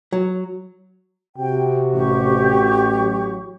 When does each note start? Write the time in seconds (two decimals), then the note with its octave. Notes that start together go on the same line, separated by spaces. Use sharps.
0.12 F#3
1.38 C3 F#4 G5
1.94 A1 G4 C#6
2.88 F#3